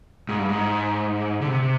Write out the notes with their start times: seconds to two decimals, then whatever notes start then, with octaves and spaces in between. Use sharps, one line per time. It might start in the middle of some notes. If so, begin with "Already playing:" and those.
0.29 G#2
0.39 G2
0.49 G#2
1.41 D3
1.47 C3